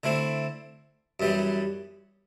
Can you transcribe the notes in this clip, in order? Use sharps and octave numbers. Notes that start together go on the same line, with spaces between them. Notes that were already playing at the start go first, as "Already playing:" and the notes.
D3 A3 C4 E4
F#2 E3 G3 B3